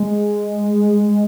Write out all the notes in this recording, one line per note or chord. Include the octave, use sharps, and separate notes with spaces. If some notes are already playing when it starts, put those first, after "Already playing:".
Already playing: G#3